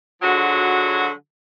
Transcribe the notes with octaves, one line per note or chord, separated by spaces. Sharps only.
D3 F3 F#3 G#3 F#4